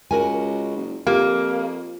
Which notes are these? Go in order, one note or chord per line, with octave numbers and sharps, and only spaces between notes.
C#2 F#4 A#4 G#5
F#1
F2 A#3 G4